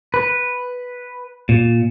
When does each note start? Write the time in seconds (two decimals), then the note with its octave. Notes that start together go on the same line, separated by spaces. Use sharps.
0.14 B4
1.49 A#2